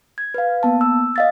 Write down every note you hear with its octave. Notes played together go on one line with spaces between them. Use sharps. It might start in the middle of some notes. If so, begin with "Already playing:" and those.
G#6
B4 F5
A#3 B3 A5
E6
D#5 F5 A6